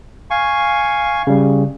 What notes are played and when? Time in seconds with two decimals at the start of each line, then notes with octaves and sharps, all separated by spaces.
0.30 F5 G#5 C#6
1.27 C#3 G3